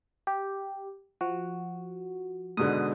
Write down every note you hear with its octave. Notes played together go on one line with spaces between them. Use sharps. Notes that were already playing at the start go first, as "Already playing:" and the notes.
G4
F3 F#4
G#2 B2 D3 D#6